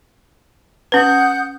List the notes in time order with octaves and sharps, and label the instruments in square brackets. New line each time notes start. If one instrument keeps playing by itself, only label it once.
[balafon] C#4 B4 [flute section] F#5 D#6 G6